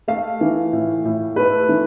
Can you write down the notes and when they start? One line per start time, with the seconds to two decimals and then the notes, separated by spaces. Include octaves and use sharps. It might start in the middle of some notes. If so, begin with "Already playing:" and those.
0.08 A3 F5
0.41 E3
0.73 A2
1.05 A2
1.36 A3 B4
1.69 E3